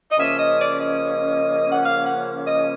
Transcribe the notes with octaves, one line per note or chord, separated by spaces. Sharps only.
D#5
C#3 F3 A#3 C#4 E5
D#5
D5
D#5
F#5
F5
F#5
D#5